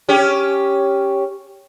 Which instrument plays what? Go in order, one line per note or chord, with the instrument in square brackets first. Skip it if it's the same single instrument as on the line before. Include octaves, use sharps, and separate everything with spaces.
[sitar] C#4 G4